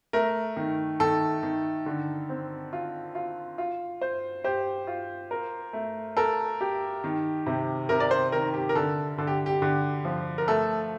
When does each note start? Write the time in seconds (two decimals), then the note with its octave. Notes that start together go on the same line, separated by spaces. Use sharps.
0.13 A3 A#4
0.57 D#3
1.00 D#3 A4
1.43 D#3
1.86 D3
2.29 C4
2.73 F4
3.15 F4
3.58 F4
4.01 C5
4.44 G4 C5
4.87 F4
5.31 A#4
5.73 A3
6.17 A4 A#4
6.61 G4
7.04 D#3
7.46 C3
7.89 C3 A#4
8.00 D5
8.11 C5
8.32 D#3 A#4
8.54 G4
8.69 A#4
8.75 D3 A4
9.18 D3 A4
9.27 G4
9.46 G4
9.62 D3
10.05 F3
10.38 A#4
10.48 A3 A4